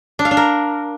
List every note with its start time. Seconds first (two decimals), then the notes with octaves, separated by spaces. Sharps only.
0.19 D4
0.25 F5
0.31 D4
0.37 A#4